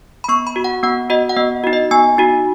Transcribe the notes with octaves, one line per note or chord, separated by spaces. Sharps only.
B5
B3 C#6
B5
F#4
F#5
B3 F#5
F#4 D#5
F#5
B3 D#5
D#4 F#4
D#5
B3 G#5
D#4 F#4